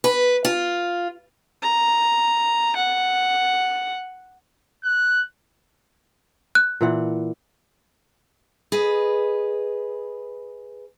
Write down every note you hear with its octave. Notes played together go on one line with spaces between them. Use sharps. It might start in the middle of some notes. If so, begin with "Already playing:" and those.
B4
F4
A#5
F#5
F#6
F#6
A#2 E3 F#5
G#4 B4 D#5